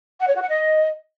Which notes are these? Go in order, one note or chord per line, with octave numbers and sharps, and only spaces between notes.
F#5
C#5
F#4
F#5
D#5